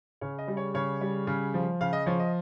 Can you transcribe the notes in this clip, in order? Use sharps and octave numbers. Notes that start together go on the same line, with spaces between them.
C#3 C#5
D#5
G3
C#5
C#3 C#5
G3
C#3
F3
C#3 F5
D#5
F3 C#5
D#5